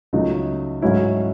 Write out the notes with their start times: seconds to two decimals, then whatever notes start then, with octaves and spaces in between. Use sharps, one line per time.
0.13 C#2 C#3 F#3 A3 D#4
0.82 G#2 F#3 A3 C#4 E4